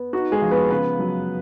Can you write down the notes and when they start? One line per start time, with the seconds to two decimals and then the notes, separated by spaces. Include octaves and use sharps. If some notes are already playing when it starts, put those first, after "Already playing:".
Already playing: B3
0.13 D#4 F#4
0.32 G#3 G#4
0.42 F3
0.51 B3 B4
0.70 C#3 B3 B4
0.99 F#3